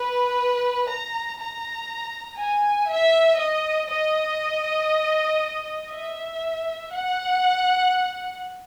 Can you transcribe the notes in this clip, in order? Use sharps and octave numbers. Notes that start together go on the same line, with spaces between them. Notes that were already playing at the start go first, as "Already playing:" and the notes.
Already playing: B4
A#5
A#5
G#5
E5
D#5
D#5
E5
F#5